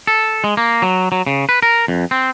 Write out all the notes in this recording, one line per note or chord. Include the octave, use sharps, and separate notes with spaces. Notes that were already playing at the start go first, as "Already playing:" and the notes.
A4
G#3
A#3
F#3
F#3
C#3
B4
A#4
F2
C4